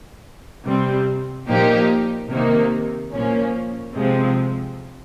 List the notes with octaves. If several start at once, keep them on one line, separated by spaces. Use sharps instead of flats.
C3 G3 C4
A#2 F3 A#3 D#4 G4
C3 D#3 A#3 D#4
A#2 F3 A#3 C#4
C3 F3 G#3 C4